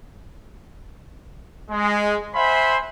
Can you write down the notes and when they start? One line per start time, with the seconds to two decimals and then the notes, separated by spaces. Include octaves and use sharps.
1.71 G#3
2.34 C5 E5 F#5 G#5 B5 C6